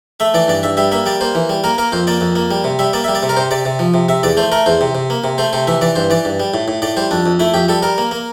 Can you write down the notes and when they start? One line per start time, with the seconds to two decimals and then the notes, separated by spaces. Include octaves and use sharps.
0.20 A3 E5
0.34 E3 D5
0.48 G2 D5
0.63 G2 E5
0.77 G3 E5
0.92 A#3 E5
1.06 G3 D5
1.21 A#3 C5
1.35 E3
1.50 G3
1.64 A#3 A#4
1.78 A#3 A#4
1.92 F2 C5
2.07 A#3 D5
2.21 F2
2.36 A#3
2.51 G3
2.64 C3
2.79 G3 E5
2.93 A#3 D5
3.04 G3 E5
3.15 D5
3.23 C3
3.29 A#4
3.37 C3 C5
3.51 C3 D5
3.65 C3
3.79 F3
3.94 C3
4.09 C3 E5
4.23 E2 D5
4.37 A3 C5
4.52 A3 A#4
4.66 E2 C5
4.81 C3
4.95 C3
5.10 A#3
5.24 C3
5.38 A3 C5
5.53 C3 C5
5.67 E3 E5
5.81 E3 D5
5.96 G2 C5
6.10 E3 D5
6.25 G2
6.40 G3
6.54 A2
6.68 A2
6.82 A2 D5
6.97 G3 C5
7.11 F2 D4
7.26 F2
7.40 A3 E4
7.54 F2 G4
7.69 G3 A4
7.82 G3 A#4
7.98 A#3
8.11 A#3